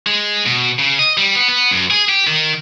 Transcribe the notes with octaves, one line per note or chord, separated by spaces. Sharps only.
G#3
B2
C#3
D#5
G3
B3
B3
F#2
G#4
G4
D#3